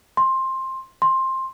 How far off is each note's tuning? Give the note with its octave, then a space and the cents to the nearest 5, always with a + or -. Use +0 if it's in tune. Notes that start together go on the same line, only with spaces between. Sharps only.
C6 +15
C6 +15